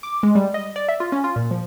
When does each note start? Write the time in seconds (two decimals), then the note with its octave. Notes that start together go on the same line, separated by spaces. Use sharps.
0.03 D6
0.23 G#3
0.35 G3
0.54 D#5
0.76 D5
0.89 E5
1.00 F4
1.12 C#4
1.24 F4
1.36 A#2
1.51 F3